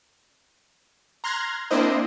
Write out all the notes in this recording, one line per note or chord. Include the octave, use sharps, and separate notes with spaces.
A#5 C6 F6 F#6 G#6 A#6
A#3 C4 D4 E4 C5 D#5